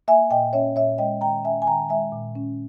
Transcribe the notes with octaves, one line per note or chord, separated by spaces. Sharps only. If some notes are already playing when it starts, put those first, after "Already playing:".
A#3 E5 G#5
A#2 D#5 G5
C#4 C#5 E5
A#2 C#5 E5
G#3 D#5 G5
D#3 G5 A#5
C#4 E5 G#5
G#5
D#3 G5 A#5
G#3 E5 G#5
A#2
C#4